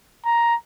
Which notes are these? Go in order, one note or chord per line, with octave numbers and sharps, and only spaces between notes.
A#5